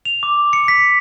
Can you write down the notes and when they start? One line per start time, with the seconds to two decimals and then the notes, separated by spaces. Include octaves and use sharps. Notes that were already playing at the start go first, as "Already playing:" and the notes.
0.05 F7
0.23 D6
0.53 C#7
0.68 B6